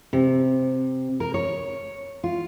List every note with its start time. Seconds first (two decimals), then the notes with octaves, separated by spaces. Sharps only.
0.13 C3
1.20 A#4
1.34 C#5
2.24 F4